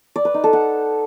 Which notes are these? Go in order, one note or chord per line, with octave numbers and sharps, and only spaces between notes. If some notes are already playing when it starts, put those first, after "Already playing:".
D5
B4
D#4
A4
F#5